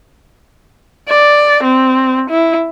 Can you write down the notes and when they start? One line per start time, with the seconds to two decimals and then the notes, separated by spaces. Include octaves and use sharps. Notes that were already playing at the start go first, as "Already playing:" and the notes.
1.09 D5
1.64 C4
2.30 E4